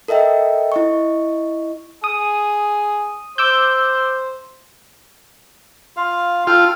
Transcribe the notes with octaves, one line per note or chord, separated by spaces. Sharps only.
A4 A#4 D#5 E5 G5
E4 D#5 C#6
G#4 D#6
C5 D6 E6 G6
F4 F5
F4 A4 G5